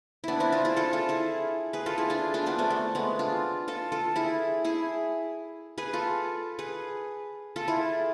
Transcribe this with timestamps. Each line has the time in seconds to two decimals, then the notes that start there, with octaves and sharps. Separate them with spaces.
0.24 B3 D4 E4
0.40 C4 E4
0.52 D4 F4
0.65 E4 G#4
0.77 F4 A4
0.93 F4 A4
1.09 E4 G#4
1.73 G#4 B4
1.86 F4 A4
1.98 E4 G#4
2.10 D4 F4
2.34 D4 F4
2.46 B3 D4
2.59 A3 C4
2.70 A3
2.95 G#3 B3
3.19 D4 F4
3.68 F4 A4
3.92 F4 A4
4.16 E4 G#4
4.65 E4 G#4
5.78 G#4 B4
5.93 F4 A4
6.59 G#4 B4
7.56 F4 A4
7.68 E4 G#4